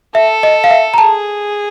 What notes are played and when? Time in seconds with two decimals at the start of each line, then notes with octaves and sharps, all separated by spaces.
0.15 A4 E5
0.43 D#5
0.64 F5
0.71 E5
0.94 A#5
0.98 G#4 A5